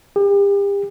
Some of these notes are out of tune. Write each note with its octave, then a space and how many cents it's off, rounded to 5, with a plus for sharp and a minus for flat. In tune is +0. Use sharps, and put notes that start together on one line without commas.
G4 +40